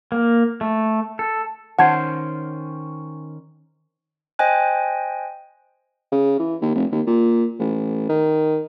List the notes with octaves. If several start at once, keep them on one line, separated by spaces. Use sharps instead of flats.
A#3
A3
A4
D#3 C#4 C5 F#5 A5 G#6
C5 D#5 G5 G#5 F#6
C#3
E3
D#2
F1
D#2
A#2
A1
D#3